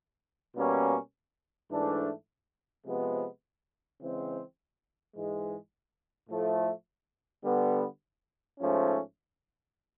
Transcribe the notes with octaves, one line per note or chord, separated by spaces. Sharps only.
B2 G3 A#3 C#4
G#2 E3 A3 D4
C3 F3 G#3 B3
C#3 E3 G#3 C4
G#2 E3 G#3
A2 F3 A3
D3 G3 B3
G#2 F3 A3 C#4